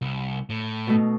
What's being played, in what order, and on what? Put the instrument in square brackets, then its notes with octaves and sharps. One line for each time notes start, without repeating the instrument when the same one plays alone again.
[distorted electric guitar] C2
A2
[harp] B2 A3 D#4